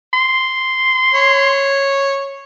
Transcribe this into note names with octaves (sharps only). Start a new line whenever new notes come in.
C6
C#5